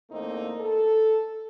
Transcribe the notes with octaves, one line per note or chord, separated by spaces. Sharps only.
E2 A3 A#3 C4 D#4
A4